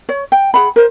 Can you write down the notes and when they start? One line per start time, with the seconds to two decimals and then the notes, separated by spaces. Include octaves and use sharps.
0.09 C#5
0.32 G5
0.54 G#4 F#5 B5
0.76 A#4 C5